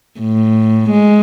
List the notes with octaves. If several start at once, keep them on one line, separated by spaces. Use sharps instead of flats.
A2
G#3